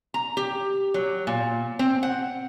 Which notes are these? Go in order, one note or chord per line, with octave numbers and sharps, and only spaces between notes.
A#5
G4
F#3
A#2
C4
F#5